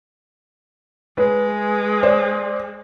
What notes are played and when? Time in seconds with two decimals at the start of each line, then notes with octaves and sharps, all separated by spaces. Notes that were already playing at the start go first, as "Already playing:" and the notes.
1.18 G#3 B4
2.03 C5 D5